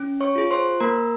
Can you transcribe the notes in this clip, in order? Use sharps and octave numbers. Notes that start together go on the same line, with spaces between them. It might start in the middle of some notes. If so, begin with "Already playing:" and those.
Already playing: C#4
C#5 C#6
F4 G#4
C5 C6
A#3 A#4 A#5